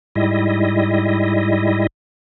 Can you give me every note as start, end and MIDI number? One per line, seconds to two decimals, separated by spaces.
0.15 1.87 44
0.15 1.87 55
0.15 1.87 64
0.15 1.87 75